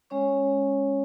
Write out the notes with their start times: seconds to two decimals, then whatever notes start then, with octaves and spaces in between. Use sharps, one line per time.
0.10 G#3 C#4 C#5 C#6